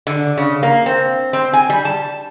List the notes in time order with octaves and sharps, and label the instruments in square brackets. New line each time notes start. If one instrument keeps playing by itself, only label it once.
[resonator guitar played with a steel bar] D3
C#3
A#3
C4
C4
G#5
G3
A5